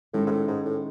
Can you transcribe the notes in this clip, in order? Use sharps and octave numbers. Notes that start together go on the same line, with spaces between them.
A2 D#3 G#3 C#4 E4 A4
G#2
A2
G#2
A2